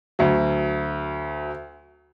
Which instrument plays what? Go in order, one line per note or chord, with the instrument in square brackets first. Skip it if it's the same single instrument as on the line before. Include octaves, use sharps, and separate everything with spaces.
[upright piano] D2 F#3